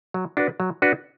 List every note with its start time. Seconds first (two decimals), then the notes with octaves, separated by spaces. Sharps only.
0.14 F#3
0.37 D4 F#4 B4
0.60 F#3
0.82 D4 F#4 B4